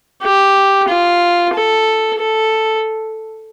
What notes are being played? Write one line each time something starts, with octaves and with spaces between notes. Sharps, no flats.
G4
F4
A4
A4